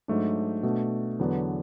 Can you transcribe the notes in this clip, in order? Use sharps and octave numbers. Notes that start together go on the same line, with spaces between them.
G#2 F#3 A3 D4
B2 A3 D4
E2 D3 F#3 B3 D4